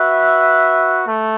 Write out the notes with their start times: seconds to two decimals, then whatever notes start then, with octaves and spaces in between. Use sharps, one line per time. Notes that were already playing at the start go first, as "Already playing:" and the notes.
Already playing: F#4 B4 E5
1.07 A3